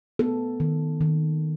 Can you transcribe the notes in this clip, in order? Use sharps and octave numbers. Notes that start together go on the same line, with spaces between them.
B3 A4
D#3
D#3